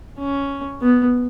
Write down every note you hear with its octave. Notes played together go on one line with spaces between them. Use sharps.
C#4
B3